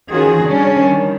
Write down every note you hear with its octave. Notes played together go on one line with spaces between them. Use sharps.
D#3 E3 C#4 F4 F#4 G#4
C#3 G3 C#4 D4
D#3 G3